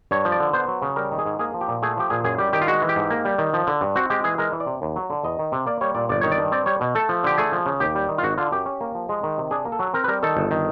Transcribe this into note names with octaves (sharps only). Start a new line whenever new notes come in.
G2 C#5
F3
D5
D3
B3 C5
F#3
C#3
G3 A#4
D#3
G#4
G#2
A#3 G#4
F3
G4
A#2
A3 G#4
F3 G4
A#2 G#4
F#2 G#4
G3 G4
D#3 G4
F4
G#3 F#4
E3
G4
G#2
A#3
G3
D#3
F3
D3
G2
C4 F#4
G#3 G4
E3 G#4
G#3 A#4
E3
D5
C3
D#2
F#3
D3
E2 D#5
D#3
C3
A#3 D5
G3 C#5
A#2 D5
G1 D5
D#3 C#5
D5
G2
C4 D5
G3 C#5
B2
A3 A4
F3
D3 G4
A3 G#4
F3
C#3
D#2 G4
G3
D#3
F4
G#1 F#4
D3 F4
F#2 G4
C#4
A#3
F3
G#3
D#3
C3
D4 G#4
A#3
A4
F#3
C4 A#4
B4
G3 A#4
D#3 A4
G1
D#3